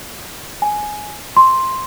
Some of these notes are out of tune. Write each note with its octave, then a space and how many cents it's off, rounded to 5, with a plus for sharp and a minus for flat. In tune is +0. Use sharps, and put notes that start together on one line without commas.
G#5 +10
C6 +5